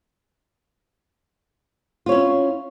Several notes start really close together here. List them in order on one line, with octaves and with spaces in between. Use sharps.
F4 C#5 E4 C#4